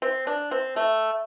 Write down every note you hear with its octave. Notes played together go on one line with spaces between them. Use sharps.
C4
D4
C4
A3